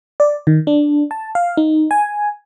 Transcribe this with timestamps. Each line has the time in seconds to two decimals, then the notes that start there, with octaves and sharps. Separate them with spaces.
0.20 D5
0.47 D#3
0.67 D4
1.11 A5
1.35 F5
1.57 D#4
1.91 G#5